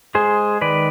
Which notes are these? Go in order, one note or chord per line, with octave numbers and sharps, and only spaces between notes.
G#3 G#4 C5
D#3 B4 D5